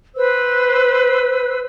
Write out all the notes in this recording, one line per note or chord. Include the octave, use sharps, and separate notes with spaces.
B4 C5 E6